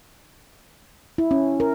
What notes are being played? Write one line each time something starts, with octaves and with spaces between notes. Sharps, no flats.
E4
C#4
A#4